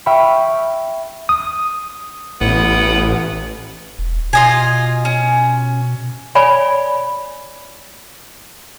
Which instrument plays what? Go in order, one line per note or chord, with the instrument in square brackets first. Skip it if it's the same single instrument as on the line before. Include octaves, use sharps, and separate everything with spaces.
[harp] E5 G5 B5 C#6 F6
[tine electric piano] D#6
[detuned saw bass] A1 [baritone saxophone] B3
[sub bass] E1
[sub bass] B2 [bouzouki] F4 D#5 G#5
[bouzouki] C#4
[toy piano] C#5 D5 G#5 B5